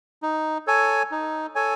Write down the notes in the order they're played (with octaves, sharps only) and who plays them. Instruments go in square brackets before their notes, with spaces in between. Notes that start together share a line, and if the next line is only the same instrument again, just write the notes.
[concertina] D#4
A4 C#5 G#5
D#4
A4 C#5 G#5